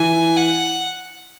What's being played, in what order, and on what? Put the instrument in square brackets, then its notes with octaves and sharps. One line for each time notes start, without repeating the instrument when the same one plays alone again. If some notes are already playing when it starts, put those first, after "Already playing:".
Already playing: [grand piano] E3 [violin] G#5
[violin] F#5